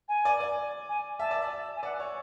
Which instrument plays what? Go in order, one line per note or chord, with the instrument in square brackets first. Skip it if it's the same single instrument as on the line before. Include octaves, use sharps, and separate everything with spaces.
[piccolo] G#5
[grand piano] D5
D5
[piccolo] G#5
[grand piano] E5 [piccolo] A5
[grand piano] D5
E5
[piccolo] G#5
[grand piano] D5 [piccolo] F#5
[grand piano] C#5